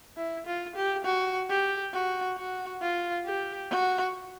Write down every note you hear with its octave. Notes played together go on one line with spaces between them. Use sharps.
E4
F4
G4
F#4
G4
F#4
F#4
F4
G4
F#4